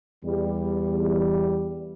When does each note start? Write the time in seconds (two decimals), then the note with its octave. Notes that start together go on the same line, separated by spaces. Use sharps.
0.24 E2 G3